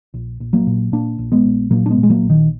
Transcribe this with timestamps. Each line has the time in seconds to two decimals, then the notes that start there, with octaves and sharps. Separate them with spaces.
0.14 A#1
0.40 A#1
0.53 F#3 A#3
0.67 A#2
0.92 A#2 A#3 D4
1.18 A#1
1.32 G#3 B3
1.45 A#1
1.70 A#2 F#3 A#3
1.86 D4
1.90 G#3 B3
1.98 A#2
2.03 G#3
2.10 F#3 A#3
2.23 A#1
2.30 D#3